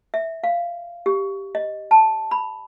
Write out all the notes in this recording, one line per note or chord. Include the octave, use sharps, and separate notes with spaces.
E5
F5
G4
D#5
A5
B5